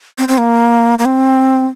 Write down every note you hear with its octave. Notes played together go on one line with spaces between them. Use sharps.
C4
C4
A#3
A#3
C4